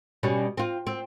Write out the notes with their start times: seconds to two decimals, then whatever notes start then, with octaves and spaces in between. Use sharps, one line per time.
0.23 B2 G3 C#4
0.57 C4 F4
0.87 C4